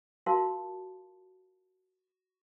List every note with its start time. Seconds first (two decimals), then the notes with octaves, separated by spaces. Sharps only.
0.26 F4 F#4 A#4 F5 A5 C6